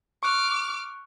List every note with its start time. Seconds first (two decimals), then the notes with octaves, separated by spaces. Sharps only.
0.23 C#6 D6 F6 F#6